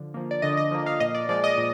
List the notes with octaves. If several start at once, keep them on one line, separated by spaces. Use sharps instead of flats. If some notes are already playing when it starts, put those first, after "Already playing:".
Already playing: D3 F3
F3 A#3
D5
D3 D#5
D#5
F3 A#3
F5
A#2 D#5
D5
F3 G#3 D5
D#5
A#2